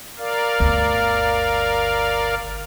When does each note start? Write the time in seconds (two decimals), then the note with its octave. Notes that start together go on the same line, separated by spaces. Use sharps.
0.18 A#4 D5 F5
0.60 G1 D2